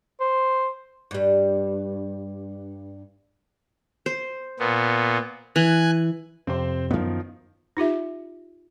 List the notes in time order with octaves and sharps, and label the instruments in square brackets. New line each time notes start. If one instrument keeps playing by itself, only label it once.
[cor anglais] C5
[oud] G2 G3
[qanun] C5
[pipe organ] A#2 B3
[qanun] E3 [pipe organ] G#5 F#6
[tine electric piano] F2 C3 [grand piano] C4 C5
[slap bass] F#2 B3 [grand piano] D#3 F3
[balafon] D#4 F4 G4 E5